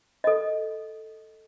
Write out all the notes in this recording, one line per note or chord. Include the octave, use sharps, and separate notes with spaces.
A4 D#5